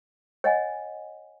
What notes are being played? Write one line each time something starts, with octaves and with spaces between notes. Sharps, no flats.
C#5 D#5 F#5 G#5